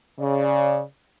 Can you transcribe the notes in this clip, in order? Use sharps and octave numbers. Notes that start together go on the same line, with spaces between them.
C#3 D5